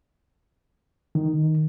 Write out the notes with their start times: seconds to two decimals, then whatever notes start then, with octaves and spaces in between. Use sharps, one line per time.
1.15 D#3